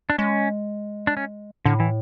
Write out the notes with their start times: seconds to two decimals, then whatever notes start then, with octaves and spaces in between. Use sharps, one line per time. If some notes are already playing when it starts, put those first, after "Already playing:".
0.10 D4
0.18 G#3 C#4
1.07 D4
1.17 C#4
1.65 A2 D3
1.80 E3